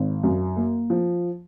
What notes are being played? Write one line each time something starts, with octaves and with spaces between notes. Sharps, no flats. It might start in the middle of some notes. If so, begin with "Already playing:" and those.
Already playing: G#1
F#2
A#3
F3